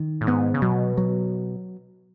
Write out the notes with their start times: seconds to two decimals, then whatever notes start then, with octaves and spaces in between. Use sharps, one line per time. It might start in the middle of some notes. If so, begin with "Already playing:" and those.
Already playing: D#3
0.21 A2
0.27 G#2 B3
0.54 C#3
0.62 B2 F#3
0.97 F#3